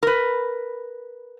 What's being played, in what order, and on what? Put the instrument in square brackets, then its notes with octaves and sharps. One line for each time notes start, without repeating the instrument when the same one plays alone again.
[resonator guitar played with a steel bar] A#4 B4